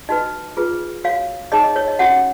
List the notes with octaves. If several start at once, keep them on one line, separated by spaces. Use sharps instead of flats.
D#4 F#4 B4 D#5
F4 G#4 B4
F#4 C#5 F5
D#4 G#4 C#5 D#5
D#5
C#5
D#5
C#4 F#4 C#5 F#5